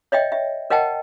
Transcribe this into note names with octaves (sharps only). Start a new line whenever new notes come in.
C#5 D#5 E5 G5
E5
A#4 D#5 F#5 G5 A5